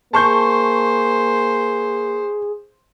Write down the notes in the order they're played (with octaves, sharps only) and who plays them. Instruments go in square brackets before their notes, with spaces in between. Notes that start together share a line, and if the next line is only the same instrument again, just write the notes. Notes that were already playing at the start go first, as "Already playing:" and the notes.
[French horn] A#3 [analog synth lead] G#4 [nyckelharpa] C5 [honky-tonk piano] A5 C#6 G6